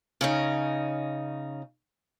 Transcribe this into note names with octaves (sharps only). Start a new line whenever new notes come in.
C#3 C#4 D#4